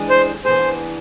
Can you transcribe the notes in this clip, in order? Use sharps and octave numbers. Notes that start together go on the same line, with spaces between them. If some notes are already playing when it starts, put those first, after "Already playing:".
Already playing: E3 G#3 D4 G#4
C5
E3 B3 D4 G#4 C5